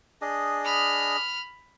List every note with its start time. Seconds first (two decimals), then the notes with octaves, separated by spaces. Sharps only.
0.22 D4 G#4 D#5
0.64 B5 F6